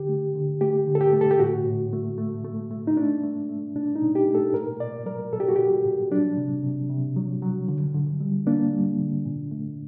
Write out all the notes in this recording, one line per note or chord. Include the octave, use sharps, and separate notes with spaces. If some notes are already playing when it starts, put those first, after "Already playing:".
Already playing: D3 G4
A3
D3
A3 G4
D3
A4
G4
A3
A4
G4
A2 F#4
A2
A3
A3
A3
A3
D#4
A3 D4
A3
A3
A#2 D4
D#4
A#2
G4
A3
A4
A#2 A#4
A#2 D5
F#3 A#4
A#2 A4
G4
F#4
A#2 G4
A#2
F#3 D4
C3
C3
C3
F#3
F#3
D3
D3
G3
A#3 D4
G3
D3
A#2
A3